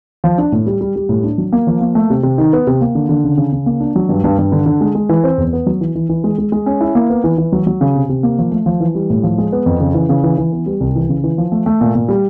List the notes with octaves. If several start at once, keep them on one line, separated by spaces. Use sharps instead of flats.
F3
D4
A2
G3
G3
G3
A2
D4
F#3
A#3
F3
A#3
A3
C3
C3
D#3
B3
C3
A#3
D3
D3
C#3
C#3
C#3
A#3
D4
F#3
G2
G2
G2
D3
D3
G#3
G#3
E3
C4
E2
B3
F#3
E3
E3
E3
G#3
G#3
G#3
C#4
E4
A#3
B3
E3
E3
F#3
F#3
C#3
C3
C3
A#3
F3
A3
F3
E3
G3
A2
F3
G#3
B3
F2
C#3
E3
C#3
E3
E3
B3
G3
C2
E3
C#3
E3
F3
A3
A3
A#2
A#2
G3